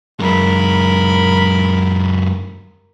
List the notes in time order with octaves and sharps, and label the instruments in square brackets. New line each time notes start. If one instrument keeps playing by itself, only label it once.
[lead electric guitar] F#2 G#3 [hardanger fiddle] A#4 B5